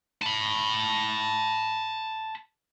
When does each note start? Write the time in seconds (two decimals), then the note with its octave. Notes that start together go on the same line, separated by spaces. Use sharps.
0.22 A5 B5